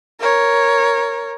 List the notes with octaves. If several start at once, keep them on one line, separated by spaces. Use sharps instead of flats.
A#4 C#5